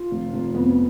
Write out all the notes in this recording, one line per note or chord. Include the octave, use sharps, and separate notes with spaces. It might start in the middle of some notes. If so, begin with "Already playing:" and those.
Already playing: F4
F1
F1
F2 B3